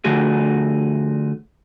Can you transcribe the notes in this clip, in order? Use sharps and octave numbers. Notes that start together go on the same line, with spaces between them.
D3 F3 A3 F#4 G#4